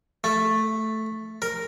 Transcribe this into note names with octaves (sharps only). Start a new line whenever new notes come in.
A3
A#4